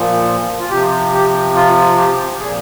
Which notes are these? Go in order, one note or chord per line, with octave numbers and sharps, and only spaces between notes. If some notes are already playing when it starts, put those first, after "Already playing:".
Already playing: A#2 F3
F4
C3 F3 G4
G4
F4
G4
A#2 F3 G#4